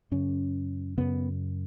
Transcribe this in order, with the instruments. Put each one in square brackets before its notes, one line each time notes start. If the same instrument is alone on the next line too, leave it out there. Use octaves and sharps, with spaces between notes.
[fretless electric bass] F#2 C#3 C#4
F#2 C#3 B3